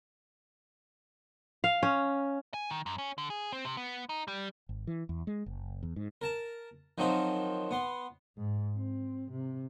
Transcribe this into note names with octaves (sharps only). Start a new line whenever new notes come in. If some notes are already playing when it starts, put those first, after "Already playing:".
F5
C#4
G#5
D#3
F#2
C#4
D3
G#4
C4
C3
B3
D#4
G3
G#1
E3
E2
G#3
F#1
E2
G#2
A#4 A5
D#3 F3 F#3 C4 D#4
B3 C6
G#2
C4
C3